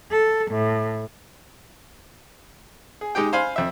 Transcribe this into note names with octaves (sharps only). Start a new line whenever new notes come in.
A4
A2
G#4
G#3 D#4 G4 G5
C5 F5 G#5 B5 C6
F2 E5